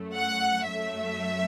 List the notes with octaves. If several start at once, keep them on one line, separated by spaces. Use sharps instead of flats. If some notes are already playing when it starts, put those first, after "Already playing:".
Already playing: F#2 F#3 A3
F#5
F#2 F#3 A3 E5